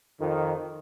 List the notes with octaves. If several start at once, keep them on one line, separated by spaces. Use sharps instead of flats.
F2 D#3